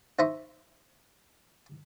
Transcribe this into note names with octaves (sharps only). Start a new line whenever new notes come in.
D#4 C5 E5 A#5 B5 C#6